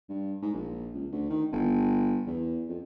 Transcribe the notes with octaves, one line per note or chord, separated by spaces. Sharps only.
G2
G#2
A#1
C#2
D2
D#3
G1
E2
F2